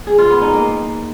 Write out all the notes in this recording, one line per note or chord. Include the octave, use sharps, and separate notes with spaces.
G#4
F4
B3
D#4
A#3